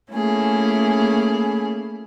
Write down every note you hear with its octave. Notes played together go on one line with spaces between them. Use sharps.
A3 A#3 C#4 E4 G#4